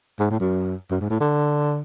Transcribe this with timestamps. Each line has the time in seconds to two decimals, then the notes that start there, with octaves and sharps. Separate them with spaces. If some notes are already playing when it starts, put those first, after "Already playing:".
0.19 G#2
0.30 A2
0.40 F#2
0.91 F#2
1.01 G#2
1.10 A2
1.20 D3